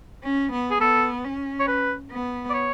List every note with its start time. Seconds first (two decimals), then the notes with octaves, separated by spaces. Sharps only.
0.23 C#4
0.52 B3
0.70 G#4
0.80 B3 A4
1.25 C#4
1.60 C#5
1.67 B4
2.11 B3
2.50 D5
2.54 C#5